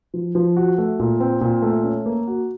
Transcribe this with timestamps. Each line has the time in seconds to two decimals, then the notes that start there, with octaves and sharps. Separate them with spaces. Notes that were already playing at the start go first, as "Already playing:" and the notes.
0.14 F3
0.35 F3
0.57 F#4
0.78 A3
1.00 A#2
1.20 C4
1.41 A#2
1.62 A3
1.84 C#4
2.06 A#3
2.27 F#4